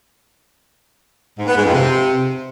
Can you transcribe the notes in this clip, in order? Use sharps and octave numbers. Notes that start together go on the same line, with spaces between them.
G#2
B3
G#2
F2
C3